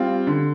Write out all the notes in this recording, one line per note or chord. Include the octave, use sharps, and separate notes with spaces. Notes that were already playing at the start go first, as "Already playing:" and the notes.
Already playing: G3 C4 F4
D3